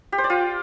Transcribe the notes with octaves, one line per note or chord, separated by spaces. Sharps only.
G4
C5
D5
F4